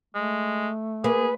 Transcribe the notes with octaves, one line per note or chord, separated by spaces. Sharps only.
G#3 A3
A#3 G#4 B4